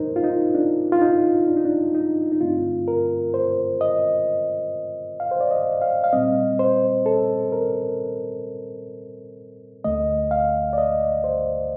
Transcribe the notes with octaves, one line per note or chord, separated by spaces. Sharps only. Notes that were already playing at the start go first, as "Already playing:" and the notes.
Already playing: G2 F3 A#3 D#4 A#4 C5
F4
D#4
D4
F4
D#4
D4
D#4
D4
D#4
D#4
G2 D3 A3 C4 F4
A#4
C5
D#5
F5
C5
D5
D#5
F5
F5
A#2 G3 C4 D#5
C5
A4
A#4
D2 D3 A3 D#5
F5
D5
D#5
C5